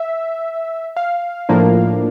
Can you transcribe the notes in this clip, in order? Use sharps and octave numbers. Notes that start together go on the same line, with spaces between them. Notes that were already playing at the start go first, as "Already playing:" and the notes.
Already playing: E5
F5
A2 F3 A#3 D4